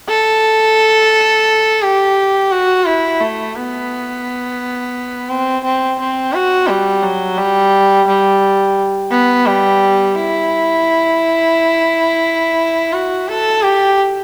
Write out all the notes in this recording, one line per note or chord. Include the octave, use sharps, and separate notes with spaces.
A4
G4
F#4
E4
A3
B3
C4
C4
C4
F#4
G3
F#3
G3
G3
B3
G3
E4
F#4
A4
G4